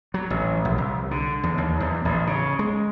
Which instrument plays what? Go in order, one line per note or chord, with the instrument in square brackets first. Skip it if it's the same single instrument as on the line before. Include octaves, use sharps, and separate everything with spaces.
[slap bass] F#3
A1
A#1
C2
D3
E2
D#2
E2
A1
C#3
G#3